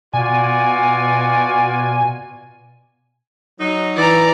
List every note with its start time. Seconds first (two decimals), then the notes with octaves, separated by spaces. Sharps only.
0.13 B2 F4 F#4 D5 G#5
3.60 F#3 D#4
3.96 E3 D5 A#5